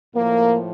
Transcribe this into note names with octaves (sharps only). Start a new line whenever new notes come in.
A2 F3 A#3